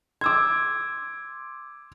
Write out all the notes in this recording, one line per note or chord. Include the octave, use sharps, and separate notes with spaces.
C6 D6 E6 G#6